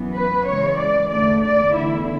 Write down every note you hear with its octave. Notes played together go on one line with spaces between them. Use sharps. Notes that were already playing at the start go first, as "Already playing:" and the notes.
Already playing: F#2 E3 B3
B4
C#3 E3 G#3 C#5
D5
E2 D3 A3 D5
D5
E2 D3 A3 E4